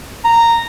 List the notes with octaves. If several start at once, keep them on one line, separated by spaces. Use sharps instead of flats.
A#5